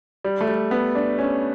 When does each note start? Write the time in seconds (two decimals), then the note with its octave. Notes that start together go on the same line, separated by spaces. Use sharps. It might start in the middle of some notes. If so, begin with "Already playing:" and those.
0.24 G3
0.41 A3
0.48 G3
0.71 B3
0.95 D4
1.19 C#4